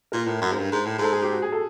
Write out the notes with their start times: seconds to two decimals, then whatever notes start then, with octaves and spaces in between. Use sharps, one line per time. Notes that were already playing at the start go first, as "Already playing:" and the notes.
0.12 A#2 A#4
0.27 A2
0.42 F#2
0.52 G#2
0.58 G2
0.72 G#2
0.86 A2
0.98 G#2 A4
1.12 G#4
1.22 G4
1.32 F#4
1.42 G#4
1.52 A4